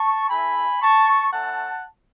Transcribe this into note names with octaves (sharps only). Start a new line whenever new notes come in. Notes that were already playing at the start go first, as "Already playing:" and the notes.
Already playing: A5 C#6
A3 E4 G#5 B5
A5 C#6
A3 C#4 E4 F#5 A5